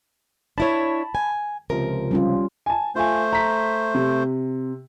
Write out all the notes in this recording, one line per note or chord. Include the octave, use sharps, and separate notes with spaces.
D4 E4 C#5 A5 B5
G#5
C#2 C3 F3 A#4
G3 C#4 F4
G#5 A5
A3 F4 C5 G#5
A#5 B6
C3